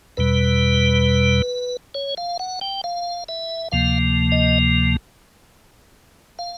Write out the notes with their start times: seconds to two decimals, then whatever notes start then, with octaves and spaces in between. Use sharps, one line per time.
0.17 E2 B2 G3 B4
1.95 C#5
2.17 F5
2.39 F#5
2.61 G5
2.84 F5
3.29 E5
3.72 D2 C3 F3 A#3 F5
4.32 D#5
6.39 F5